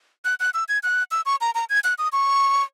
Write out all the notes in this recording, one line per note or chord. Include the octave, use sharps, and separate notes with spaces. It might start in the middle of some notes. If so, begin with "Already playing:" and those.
F#6
F#6
E6
G#6
F#6
E6
C#6
A#5
A#5
G#6
F#6
D#6
C#6